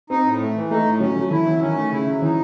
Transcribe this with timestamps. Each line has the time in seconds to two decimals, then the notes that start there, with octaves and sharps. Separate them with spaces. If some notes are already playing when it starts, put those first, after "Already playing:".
0.10 C4 D#4
0.25 A2
0.40 A3
0.55 E3
0.71 A3 D#4
0.86 A2
1.00 F#3 C#4
1.16 F#3 A3
1.31 E3 E4
1.46 E3 F#3
1.62 D#3 C#4
1.76 A3
1.92 C#3 E4
2.07 F#3
2.22 E3 D#4